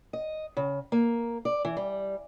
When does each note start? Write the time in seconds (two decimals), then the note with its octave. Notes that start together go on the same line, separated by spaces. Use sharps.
0.13 D#5
0.57 C#3
0.92 A#3
1.45 D5
1.65 E3
1.77 G3